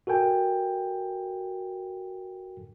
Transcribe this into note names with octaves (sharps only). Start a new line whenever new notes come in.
F#4 A4 A#4 G5 G#5